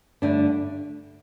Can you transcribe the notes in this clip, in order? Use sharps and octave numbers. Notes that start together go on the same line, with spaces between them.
G2 D3 A3 D4